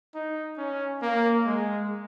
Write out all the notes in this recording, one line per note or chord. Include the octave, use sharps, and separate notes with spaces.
D#4
C#4
A#3
G#3